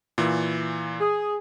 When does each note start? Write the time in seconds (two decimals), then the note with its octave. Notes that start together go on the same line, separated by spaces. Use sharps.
0.18 A#2 E3
1.00 G#4